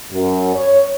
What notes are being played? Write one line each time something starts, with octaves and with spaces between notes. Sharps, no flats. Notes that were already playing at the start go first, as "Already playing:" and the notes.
F#2
C#5